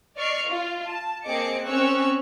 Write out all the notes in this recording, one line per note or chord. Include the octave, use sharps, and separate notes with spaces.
D5 D#5 C#6 F6 C7 D7
F4
A5
A#3 C4 G#4 D#5 D6 C#7
C4 C#4 C#5 C#6 E6 F#6